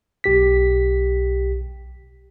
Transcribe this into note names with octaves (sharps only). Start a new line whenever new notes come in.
B1 G4 B6